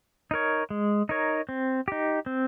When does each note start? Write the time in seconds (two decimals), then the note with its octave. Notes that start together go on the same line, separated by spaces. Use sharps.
0.31 D#4 A#4 C#5
0.70 G#3
1.09 D#4 A#4 C#5
1.49 C4
1.88 D#4 G4
2.26 C4